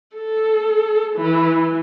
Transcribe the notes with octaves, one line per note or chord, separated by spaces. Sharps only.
A4
E3